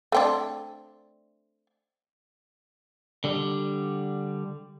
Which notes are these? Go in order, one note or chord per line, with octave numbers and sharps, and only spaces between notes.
A3 C4 D4
D3 G3